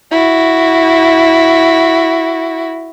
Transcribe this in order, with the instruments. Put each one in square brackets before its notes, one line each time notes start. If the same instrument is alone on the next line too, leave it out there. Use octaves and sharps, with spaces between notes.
[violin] E4 F#4